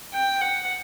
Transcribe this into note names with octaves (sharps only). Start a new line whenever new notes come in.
G5
F#5